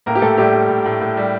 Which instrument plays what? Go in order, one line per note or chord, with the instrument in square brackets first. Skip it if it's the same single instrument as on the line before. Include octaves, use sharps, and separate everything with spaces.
[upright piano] A2 A#3 A#4
G4
A2 A3 A4
A2 G3 G4
G3
A2
A2
A2
G3